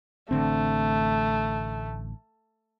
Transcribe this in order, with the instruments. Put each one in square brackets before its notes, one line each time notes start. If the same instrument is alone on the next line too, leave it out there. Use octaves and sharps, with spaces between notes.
[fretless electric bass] A1 D3 C4 [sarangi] A3